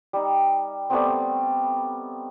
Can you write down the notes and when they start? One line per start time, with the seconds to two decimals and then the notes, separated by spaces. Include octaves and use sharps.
0.13 G3 D#4
0.90 G3 A3 B3 C4